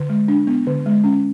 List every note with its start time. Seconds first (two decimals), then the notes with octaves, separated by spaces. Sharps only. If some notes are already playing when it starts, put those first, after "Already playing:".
Already playing: D3
0.09 G#3
0.28 D4
0.47 B3
0.67 D3
0.86 G#3
1.04 C#4